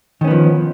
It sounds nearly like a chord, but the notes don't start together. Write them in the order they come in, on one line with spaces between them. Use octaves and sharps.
D#3 C#4 B3 F3